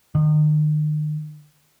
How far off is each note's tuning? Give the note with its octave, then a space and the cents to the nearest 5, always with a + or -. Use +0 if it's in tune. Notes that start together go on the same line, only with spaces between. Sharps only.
D#3 -40